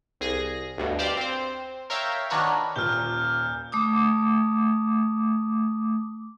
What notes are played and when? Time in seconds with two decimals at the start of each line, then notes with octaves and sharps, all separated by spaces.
0.21 C2 G#4 A#6
0.78 D2 G2 B2
0.99 G4 C5 D5 F5
1.17 C4 C5
1.90 A#4 C#5 E5 F5 G5 E6
2.30 D#3 D4 F#4 A#4 B4 C#5
2.76 D#1 A#2 F6 G6 G7
3.72 A3 D6 D#6